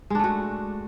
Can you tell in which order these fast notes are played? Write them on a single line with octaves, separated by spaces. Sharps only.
G#3 D4 A3 F#4